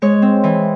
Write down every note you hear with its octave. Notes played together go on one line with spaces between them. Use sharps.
G#3 C#5
C4
E3